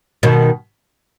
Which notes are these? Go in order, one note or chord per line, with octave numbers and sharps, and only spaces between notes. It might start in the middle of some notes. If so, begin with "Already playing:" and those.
B2 D#3